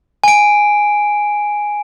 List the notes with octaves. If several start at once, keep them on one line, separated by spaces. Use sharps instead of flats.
G#5 D7